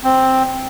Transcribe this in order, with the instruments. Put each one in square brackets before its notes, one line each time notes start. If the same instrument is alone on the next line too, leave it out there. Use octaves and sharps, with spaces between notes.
[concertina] C4